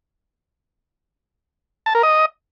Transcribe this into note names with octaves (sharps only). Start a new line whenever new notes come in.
A5
A#4
D#5